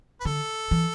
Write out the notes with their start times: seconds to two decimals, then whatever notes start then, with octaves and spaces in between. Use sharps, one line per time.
0.20 B4
0.25 D3 A4
0.71 E3